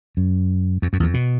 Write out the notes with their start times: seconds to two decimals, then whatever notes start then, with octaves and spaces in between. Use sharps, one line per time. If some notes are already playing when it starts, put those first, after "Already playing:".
0.17 F#2
0.82 F2
0.93 F#2
1.00 E2
1.03 F2
1.14 B2